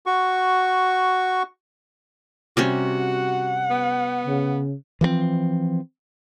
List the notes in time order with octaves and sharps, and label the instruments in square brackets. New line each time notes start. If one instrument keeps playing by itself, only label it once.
[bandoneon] F#4 C#6
[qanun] C3 G3 C#4 [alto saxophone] F#4
[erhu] F#5
[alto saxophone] B3
[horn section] C#3
[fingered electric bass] E3 F3 G#3 C4